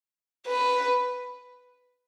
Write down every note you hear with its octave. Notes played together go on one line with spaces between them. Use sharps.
B4